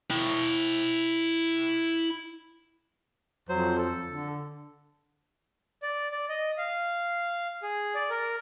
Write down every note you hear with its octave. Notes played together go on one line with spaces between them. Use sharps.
E4 G5
F2 F#3 C5
A4
D3
D5
D5
D#5
F5
G#4
D5
A#4